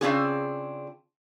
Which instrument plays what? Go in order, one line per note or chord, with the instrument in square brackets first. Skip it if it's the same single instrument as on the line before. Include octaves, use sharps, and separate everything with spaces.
[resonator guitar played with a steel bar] C#3 F3 C4 D4 F4 G#4